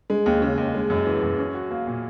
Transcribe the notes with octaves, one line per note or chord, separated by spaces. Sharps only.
G#3
D#2
C#3
D#2
G#3
F#2
E3
F#2
C#4
F#4
A#3
A#2